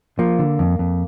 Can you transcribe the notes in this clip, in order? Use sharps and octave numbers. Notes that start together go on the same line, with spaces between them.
F3 A#3
D3
F2
F2